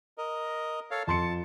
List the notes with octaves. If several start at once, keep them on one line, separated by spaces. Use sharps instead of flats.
A#4 D#5
A4 C#5 F5
F2 A5 C6 C#7